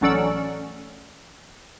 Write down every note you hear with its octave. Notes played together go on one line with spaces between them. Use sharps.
A1 F#3 C#4 A4 D5 E6